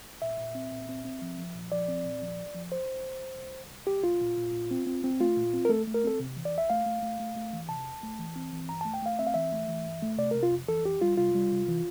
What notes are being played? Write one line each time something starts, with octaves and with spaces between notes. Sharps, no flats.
A#2 E5
A#2
C4
A#2
C4
C4
F3
F3
A#2
F3 D5
C4
A#2
F3
C2
F3
C2 C5
C2
C2
C2
C2
C2
C2
C2 G4
C2 F4
A#2
A#2
A#2
C4
C4
C4
A3 F4
A#2
C4
A#4
A3 A4
A3
A#4
C4 A4
C3
E3
D5
E2
E5
A3 F5
A3
A3
A3
A3
E3
C3 A5
E2
A3
E3
C4
E3
G2 A#5
A3 A5
G5
A3 F5
C4 E5
F5
E3 E5
A3
E3
G2
A3
C3 D5
C3 A#4
F4
F2
E3 A4
F2 G4
G3 F4
C3 F4
G3
C3
E3